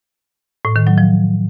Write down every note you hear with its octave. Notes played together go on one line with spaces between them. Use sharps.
A2
D#3
F#3
F3